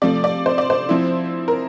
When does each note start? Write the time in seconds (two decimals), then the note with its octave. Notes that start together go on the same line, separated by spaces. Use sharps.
0.02 C3 F3 A3 D5
0.24 D5
0.46 C5
0.58 D5
0.70 C5
0.89 F3 C4 E4
1.48 A#4